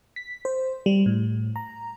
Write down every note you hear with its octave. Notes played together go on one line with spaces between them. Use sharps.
B6
C5
G3
A2
A#5